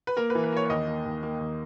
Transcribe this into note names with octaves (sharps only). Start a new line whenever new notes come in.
B4
A#3 A#4
B4
E3
B4
A#3 C#5
C#5
D#2 D#5
A#3
D#2
A#3
D#2